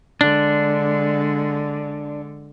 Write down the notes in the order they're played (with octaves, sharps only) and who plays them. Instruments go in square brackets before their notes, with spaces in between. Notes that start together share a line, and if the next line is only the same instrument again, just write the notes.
[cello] D3 G#3 [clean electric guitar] D4